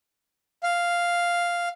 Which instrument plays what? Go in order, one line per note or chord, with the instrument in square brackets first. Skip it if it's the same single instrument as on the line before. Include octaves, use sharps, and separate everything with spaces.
[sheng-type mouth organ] F5